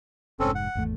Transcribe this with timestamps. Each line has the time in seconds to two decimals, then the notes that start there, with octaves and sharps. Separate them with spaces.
0.40 F1 G#2 C4 C#4 A4
0.55 F#5
0.75 G#1 E2 A3